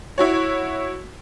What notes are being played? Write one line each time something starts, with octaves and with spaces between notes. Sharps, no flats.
E4 F#4 C#5